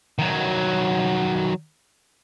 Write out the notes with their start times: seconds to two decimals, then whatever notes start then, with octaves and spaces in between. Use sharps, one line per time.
0.19 D#3 F#3